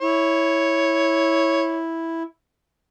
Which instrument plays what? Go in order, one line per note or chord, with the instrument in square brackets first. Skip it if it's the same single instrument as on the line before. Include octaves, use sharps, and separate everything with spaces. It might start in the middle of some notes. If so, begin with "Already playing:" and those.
[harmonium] E4 [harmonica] C#5